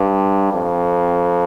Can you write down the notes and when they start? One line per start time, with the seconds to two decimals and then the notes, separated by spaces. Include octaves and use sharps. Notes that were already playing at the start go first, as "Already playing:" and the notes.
Already playing: G2
0.53 F2